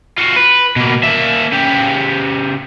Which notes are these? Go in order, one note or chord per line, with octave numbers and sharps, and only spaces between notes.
F4 F#4
B4
B2 A#3
A#3 E5
C#3 G4